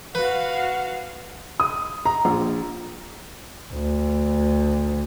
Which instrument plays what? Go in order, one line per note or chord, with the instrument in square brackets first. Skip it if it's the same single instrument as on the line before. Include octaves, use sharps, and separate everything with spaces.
[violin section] F#4 F5 [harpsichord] B4
[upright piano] D#6
A#5
A#1
[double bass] D2